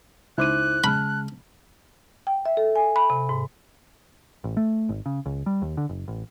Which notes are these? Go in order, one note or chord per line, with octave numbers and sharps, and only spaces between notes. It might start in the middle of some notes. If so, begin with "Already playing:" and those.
C#2 D#4 E4 C5 D6 F#6 D#7
C#3 G#3 A5 B5 F6
G5
E5
A4
G#5
B5
C3
G#2
A1
A3
G#1
C#3
C#2
G3
D#2
D3
F#1
A1